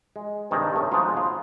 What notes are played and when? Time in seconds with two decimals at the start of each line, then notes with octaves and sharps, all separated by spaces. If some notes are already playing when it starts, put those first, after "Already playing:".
0.16 G#3
0.51 G2 C3 D#3 G#4 A5 A#5
0.74 G2 A3 C#4
0.91 F3 G#3 B3 D#4 F4 F#4
1.17 F4